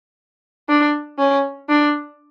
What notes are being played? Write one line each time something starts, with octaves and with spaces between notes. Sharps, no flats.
D4
C#4
D4